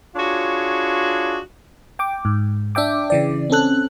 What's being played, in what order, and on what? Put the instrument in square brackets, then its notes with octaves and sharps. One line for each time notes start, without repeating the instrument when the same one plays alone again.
[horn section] D4 F4 F#4 G#4 C#5
[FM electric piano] G5 D6
G#2
D4 E5 G5 D6
C#3 E3 D5
C4 C#4 A4 F#6